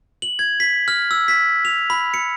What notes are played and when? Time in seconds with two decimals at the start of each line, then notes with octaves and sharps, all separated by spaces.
0.22 F#7
0.39 G#6
0.60 B6
0.88 F6
1.11 E6
1.28 B6
1.65 F7
1.90 B5
2.14 C#7